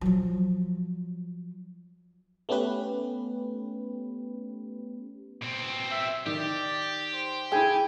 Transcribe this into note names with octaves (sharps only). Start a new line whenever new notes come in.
F3 F#3
A3 B3 C#4 G4 B4
B2 C4
E5
D#3 G4 D5
C5
E4 G#4 G5 G#5